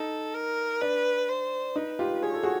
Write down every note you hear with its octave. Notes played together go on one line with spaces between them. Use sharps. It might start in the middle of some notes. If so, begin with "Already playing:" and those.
Already playing: D#4 A4
A#4
D4 B4
C5
D#4 B4
F4 G4
G#4 C#5
A4
F#4 G#4